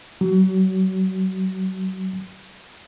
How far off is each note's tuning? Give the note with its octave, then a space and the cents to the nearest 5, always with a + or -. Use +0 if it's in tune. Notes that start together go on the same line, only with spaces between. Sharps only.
F#3 +30